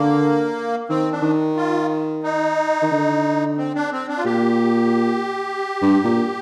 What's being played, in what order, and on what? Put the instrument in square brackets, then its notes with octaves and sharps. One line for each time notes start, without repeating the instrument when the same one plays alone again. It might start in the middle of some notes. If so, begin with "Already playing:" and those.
Already playing: [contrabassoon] D3 [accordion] A#3
[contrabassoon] D#3 [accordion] C4
[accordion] D4
[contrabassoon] D#3
[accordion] F4
D#4
[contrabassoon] D#3
D3
[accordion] C4
D4
C4
D4
F4
[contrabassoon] A#2 [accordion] G4
[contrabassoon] G2
A#2